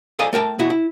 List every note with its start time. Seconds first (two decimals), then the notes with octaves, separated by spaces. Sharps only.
0.19 A4 C5 D5 D#5 F5 G#5
0.33 A3 A#4 G5 A5
0.59 B2 E4 F#4
0.70 E4